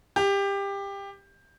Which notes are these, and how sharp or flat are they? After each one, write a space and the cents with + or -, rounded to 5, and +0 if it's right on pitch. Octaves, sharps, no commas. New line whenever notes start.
G4 +20